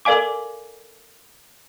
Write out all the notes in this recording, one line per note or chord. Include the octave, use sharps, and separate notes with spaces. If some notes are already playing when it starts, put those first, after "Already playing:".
A4 A#4 D5 F5 G#5 D6